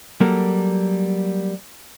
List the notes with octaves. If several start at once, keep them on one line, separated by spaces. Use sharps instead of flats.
F#3 G3 A#3 A4 A#4